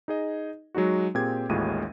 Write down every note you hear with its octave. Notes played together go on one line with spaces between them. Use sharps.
D#4 G#4 D#5
F#3 G#3 D#4 F#4
A#2 C4 G4 G#4 G5 G#6
A1 D#2 A2 G#3 F4 D#7